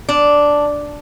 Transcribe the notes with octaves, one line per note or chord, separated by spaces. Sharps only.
D4